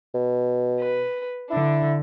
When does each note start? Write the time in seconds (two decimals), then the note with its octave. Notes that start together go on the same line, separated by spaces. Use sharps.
0.14 B2
0.81 B4
1.50 D3 D4 E4